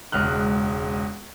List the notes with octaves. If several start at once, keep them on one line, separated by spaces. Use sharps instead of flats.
E1 C#2 F6 F#6